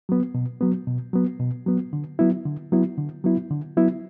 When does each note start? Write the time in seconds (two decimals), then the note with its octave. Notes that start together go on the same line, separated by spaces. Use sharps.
0.09 F#3 B3
0.35 B2
0.61 F#3 B3
0.87 B2
1.13 F#3 B3
1.40 B2
1.66 F#3 B3
1.93 D3
2.19 F#3 B3 E4
2.46 D3
2.72 F#3 B3 E4
2.98 D3
3.24 F#3 B3 E4
3.50 D3
3.77 F#3 B3 E4